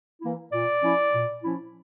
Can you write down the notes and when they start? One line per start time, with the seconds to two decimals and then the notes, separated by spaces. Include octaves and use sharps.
0.20 E3 A#3 E4
0.51 A#2 D5
0.81 F3 C#4 E4
1.13 A#2
1.43 F3 C#4 E4